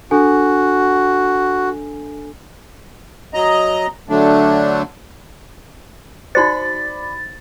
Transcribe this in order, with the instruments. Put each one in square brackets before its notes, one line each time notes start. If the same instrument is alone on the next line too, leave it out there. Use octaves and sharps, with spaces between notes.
[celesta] D4 A4 G#5 [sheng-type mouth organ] F#4
[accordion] F#3 D#5 A#5
D3 F#3 A3 D4
[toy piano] D#4 F#4 C5 [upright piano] D5 B5 [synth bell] A6